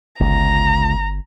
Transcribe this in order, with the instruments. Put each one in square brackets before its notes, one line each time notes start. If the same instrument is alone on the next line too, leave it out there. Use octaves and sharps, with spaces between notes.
[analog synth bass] G1 [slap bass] C#2 [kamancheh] A#5